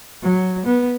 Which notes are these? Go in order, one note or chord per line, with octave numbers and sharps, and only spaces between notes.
F#3
B3